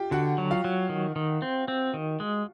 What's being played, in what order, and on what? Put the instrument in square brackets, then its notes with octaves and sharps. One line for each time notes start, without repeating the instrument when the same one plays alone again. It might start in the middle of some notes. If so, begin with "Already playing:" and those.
Already playing: [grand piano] F4 G4 G5
[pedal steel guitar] D3 [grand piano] F#4 F#5
[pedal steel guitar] F#3
[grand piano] F4 F5
[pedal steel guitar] F#3
D#3
D#3
C4
C4
D#3
G#3